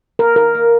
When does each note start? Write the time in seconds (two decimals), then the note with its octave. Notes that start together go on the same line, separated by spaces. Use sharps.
0.19 A#3 A#4
0.36 D#3 A#4
0.55 A#3